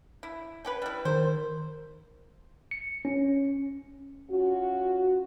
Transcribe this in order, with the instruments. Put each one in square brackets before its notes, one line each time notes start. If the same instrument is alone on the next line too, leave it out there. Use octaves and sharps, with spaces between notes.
[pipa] E4
C#4 G4 B4
G3 E4
[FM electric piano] D#3 A#4 [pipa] C5
[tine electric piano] C#7
C#4
[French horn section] C#4 F4 F#4